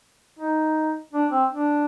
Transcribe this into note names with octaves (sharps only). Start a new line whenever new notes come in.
D#4
D4
C4
D4